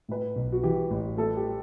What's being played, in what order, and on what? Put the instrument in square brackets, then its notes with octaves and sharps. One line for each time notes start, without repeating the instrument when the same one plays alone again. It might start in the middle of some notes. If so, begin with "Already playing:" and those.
[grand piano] A2 [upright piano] B4
[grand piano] B1
[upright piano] F#4
[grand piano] E3 [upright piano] G4
[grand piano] A1
[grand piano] A3 [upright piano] A4
[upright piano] G4